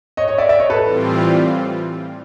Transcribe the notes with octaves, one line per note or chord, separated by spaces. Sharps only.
C#5 D#5
C#5 D#5
D5 E5
D5 E5
C#5 D#5
A4 B4
A2 E3 G3 C4 F4